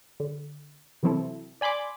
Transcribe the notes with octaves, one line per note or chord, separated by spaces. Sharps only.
D3
C3 E3 F#3 C4 E4 A4
D5 G#5 B5 C6 D6